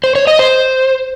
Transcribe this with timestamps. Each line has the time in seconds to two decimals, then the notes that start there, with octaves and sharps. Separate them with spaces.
0.04 C5
0.15 C#5
0.27 D#5
0.39 C5